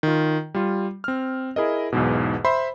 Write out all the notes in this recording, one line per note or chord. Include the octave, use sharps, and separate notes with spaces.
D#3 F4
G3 F4
C4 F6
E4 G#4 A#4 D#5
B1 E2 G#2 B2
C5 E5 B5 C6